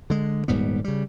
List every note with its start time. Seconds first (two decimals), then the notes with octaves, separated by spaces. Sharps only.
0.10 D3 G#3
0.48 D#1 G#2 G3 B3
0.84 C#3 G3